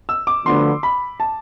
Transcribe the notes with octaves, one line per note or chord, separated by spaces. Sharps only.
E6
D6
D2 D3 F3 B3 C6
B5
A5